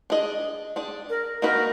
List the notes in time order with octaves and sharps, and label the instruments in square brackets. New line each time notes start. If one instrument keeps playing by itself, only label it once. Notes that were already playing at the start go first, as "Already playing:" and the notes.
[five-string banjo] D4 G#4 D#5
D4 G#4 D5
[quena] A#4
[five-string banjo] A#3 D#4 F#4 B4 [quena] A#4